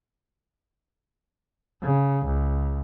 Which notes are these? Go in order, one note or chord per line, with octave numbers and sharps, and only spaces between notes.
C#3
C#2